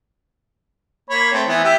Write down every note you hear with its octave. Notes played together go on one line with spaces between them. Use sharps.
A#3 C#5 B5
A3 C4
E3 B3 E4
E4 G4 E5